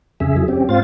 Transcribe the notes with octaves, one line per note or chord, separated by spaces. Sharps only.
F2 C#3 G#4 E5
F2 F#3 E4 G#4
C4 C#4 G4
G#2 C4 F4 C5 F5 A6